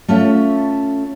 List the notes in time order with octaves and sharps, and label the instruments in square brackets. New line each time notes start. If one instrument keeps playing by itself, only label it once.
[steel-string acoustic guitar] A3 C#4 F4 A4 E5